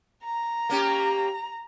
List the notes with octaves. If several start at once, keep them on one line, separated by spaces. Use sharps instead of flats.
A#5
A#3 C#4 G4